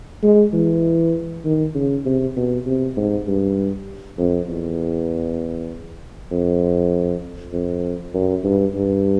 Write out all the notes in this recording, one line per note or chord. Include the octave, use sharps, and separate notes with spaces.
G#3
E3
D#3
C#3
C3
B2
C3
G#2
G2
F2
E2
F2
F2
F#2
G2
G2